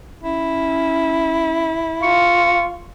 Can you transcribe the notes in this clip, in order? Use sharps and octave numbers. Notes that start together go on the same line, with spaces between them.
C#4 E4
F4 C#6